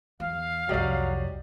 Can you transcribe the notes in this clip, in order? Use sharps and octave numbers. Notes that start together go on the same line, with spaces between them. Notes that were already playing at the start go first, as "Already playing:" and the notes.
E2 F5
C2 F2 F#3 G4 D5 D#5